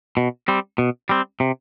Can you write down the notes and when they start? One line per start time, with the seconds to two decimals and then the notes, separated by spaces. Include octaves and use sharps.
0.17 B2
0.48 G3 C4
0.78 B2
1.09 G3 C4
1.40 C3